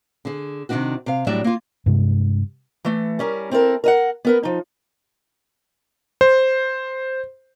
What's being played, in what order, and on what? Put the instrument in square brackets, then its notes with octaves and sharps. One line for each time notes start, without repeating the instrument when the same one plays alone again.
[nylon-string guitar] D3 G#4
C3 D#3 G#3 D4 D#4 F#4
C3 F5
A2 F#3 G3 D4 D5 E5
A#3 F4
[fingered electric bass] G2 C3 G#3
[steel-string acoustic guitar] E3 A3
G3 C#4 A#4
C4 E4 A4 A#4
A#4 D#5 F#5
B3 A#4 B4
F3 D#4
[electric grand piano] C5